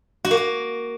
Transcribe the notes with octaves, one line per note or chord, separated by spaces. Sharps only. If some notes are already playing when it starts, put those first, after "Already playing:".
F#4
A#3
F#4